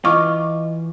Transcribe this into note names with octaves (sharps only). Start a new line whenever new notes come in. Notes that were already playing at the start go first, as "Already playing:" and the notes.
E3 F4 D#5 C#6 D6 F6